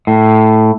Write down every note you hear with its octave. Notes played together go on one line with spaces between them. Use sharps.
A2